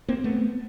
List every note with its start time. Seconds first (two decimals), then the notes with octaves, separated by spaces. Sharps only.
0.08 A#3 C4
0.24 A3 B3